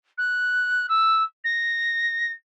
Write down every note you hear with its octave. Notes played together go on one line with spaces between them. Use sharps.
F#6
E6
A#6